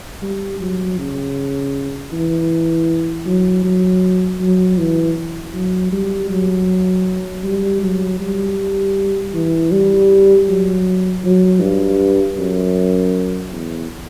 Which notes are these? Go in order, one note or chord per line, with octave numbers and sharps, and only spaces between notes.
G3
F#3
C#3
E3
F#3
F#3
F#3
E3
F#3
G3
F#3
G3
F#3
G3
E3
G3
F#3
F#3
G2
F#2
E2